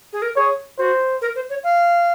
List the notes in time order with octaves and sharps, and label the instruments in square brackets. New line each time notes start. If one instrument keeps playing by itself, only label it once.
[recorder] G#4
A#4
[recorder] G#4 [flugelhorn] C#5
[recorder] F#4 [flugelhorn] C5
[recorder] A#4
C5
C#5
F5